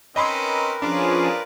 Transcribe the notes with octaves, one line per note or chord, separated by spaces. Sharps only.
C4 C#4 D#4 A#4 B4 D#5 B5 C6
F3 C#4 D4 F4 G#4 D5